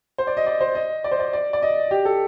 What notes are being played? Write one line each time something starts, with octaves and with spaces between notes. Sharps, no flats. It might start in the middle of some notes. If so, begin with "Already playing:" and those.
C5
D5
D#5
D5
C5
D#5
D5
C5
D5
D5
D5
D#5
G4
A4